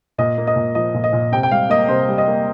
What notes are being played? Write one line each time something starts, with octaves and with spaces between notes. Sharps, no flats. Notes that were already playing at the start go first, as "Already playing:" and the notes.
A#2 D#5
A#3
D#5
A#2
F3 D#5
A#2
D#5
A#2
C3 G5
G5
G3 F5
A#3 D#5
C3 C5
G3
D#5
A#3